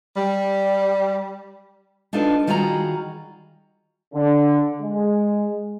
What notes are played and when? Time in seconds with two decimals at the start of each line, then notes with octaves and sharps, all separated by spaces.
0.16 G3
2.13 D4 D#4 F4 A4 B4 D5
2.47 D#3 G3 F4 F#4 G#4 A#5
4.13 D3
4.81 G#3